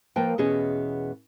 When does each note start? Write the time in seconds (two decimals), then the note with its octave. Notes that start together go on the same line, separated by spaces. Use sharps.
0.16 F3 A#3 A#4 B4 G5 A5
0.38 E2 B2 B3 C#4 G#4 D#5